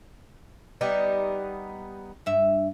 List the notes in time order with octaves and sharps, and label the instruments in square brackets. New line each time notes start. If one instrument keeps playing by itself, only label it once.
[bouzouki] G3 B3 D#4
[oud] G2 E5